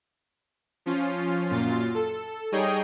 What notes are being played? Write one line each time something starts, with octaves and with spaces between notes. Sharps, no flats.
F3 C#4 F4
F#2 A#2 F4 A6
A4
G3 D#4 G#4 C#5 D#5 G5